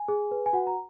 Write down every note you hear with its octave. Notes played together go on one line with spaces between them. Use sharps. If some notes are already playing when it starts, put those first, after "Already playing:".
Already playing: G#5
G#4
B4
G#5
F#4 F#5
A#5